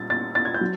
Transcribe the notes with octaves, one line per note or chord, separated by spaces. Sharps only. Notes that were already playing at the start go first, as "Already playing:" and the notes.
Already playing: A#2 G3 A6
A6
A6
G#6
G6
F#3